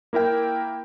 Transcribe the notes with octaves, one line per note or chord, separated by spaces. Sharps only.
A#3 E4 A#4 G5